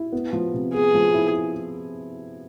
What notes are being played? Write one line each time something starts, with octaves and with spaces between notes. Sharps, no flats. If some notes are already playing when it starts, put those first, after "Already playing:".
Already playing: E4
B3
F3
C3
B3 G#4
F3
E4